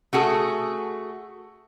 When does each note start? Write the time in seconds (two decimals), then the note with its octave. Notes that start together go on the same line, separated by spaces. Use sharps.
0.13 A3 F#4 G#4 A4